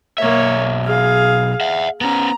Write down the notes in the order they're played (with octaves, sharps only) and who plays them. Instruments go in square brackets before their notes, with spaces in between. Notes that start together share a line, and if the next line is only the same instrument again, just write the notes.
[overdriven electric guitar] B1 E5 [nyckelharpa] A#3 C#5
[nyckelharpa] G#4 F5
[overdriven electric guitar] E5 F#5
[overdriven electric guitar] B3 C#4 [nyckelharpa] A#5